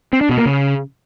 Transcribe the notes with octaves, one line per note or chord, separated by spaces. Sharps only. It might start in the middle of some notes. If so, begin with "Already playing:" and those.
C4
D4
B2
A#3
C#3